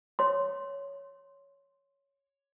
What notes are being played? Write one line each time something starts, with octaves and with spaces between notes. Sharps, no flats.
C#5 C6